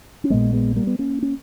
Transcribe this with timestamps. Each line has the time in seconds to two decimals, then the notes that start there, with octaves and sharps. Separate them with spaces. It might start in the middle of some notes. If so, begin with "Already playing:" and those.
0.24 C#4
0.30 A#1 A#2 G#3 B3
0.53 G#3 B3
0.76 G3 A#3
0.87 B3
0.99 A#3 C#4
1.22 C#4